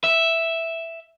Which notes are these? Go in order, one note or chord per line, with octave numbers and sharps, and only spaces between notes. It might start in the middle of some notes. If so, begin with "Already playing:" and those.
E5